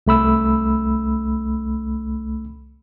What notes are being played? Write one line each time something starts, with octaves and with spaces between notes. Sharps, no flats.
C2 A3 B5 E6